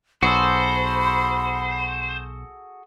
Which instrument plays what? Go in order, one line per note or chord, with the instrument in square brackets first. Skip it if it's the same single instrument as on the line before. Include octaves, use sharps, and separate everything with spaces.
[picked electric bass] B1 [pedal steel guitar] F#4 G#4 A4 [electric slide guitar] C5 [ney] B5